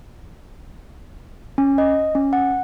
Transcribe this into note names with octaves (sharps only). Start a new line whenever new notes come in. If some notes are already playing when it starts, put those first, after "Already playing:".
C#4
D#5
C#4
F#5